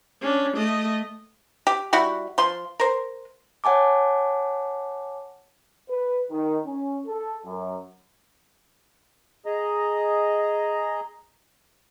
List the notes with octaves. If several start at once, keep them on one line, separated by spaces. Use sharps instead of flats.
C#4 D4
A3 D#5
G4
G3 E4 F#4
F3 C6
A#4 C5
C#5 F#5 G#5 A5 D6
B4
D#3
C#4
A4
F#2
G#4 D#5 A#5